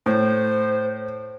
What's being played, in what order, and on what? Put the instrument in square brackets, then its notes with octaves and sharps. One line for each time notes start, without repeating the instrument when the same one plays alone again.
[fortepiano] A2 [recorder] C5